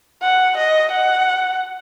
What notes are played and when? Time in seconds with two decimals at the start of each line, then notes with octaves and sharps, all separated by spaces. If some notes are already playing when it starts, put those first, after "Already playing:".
0.22 F#5
0.57 D#5
0.92 F#5